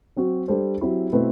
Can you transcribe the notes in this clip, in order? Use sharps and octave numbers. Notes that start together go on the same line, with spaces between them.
F#3 C4 F#4
G3 D4 A4 C5
F#3 C4 E4 G4
B2 A3 C4 E4 B4